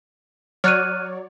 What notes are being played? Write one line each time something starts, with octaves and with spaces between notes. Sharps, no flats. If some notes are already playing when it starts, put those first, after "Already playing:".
F#3 C#5 D5 F6 F#6 D#7